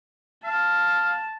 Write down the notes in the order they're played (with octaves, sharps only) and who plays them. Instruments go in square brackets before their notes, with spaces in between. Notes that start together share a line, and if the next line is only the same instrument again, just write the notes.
[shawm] F5 [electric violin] A5